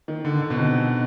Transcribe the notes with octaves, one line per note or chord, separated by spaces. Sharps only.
D#3
D3
D3
B2
C3